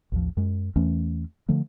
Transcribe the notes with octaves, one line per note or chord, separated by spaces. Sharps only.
A1 D#2 F3
F#2 G#3
E2 E3 A3 C#4
D3 F3 A3